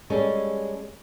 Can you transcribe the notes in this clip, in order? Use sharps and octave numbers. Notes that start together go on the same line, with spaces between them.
G3 G#3 C#4 A4